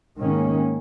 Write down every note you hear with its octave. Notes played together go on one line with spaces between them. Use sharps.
G#2 D#3 A#3 C#4